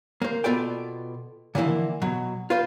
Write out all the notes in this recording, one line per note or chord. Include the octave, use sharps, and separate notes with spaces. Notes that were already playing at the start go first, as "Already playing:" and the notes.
A#3 C5
B2 B3 F4 A4 D5 G5
D3 E3 F3 A#3 E4
B2 F#3
F4 B4 C5